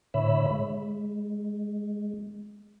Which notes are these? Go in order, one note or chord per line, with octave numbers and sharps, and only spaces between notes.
A2 D3 C#5 E5 B5 E6
G#3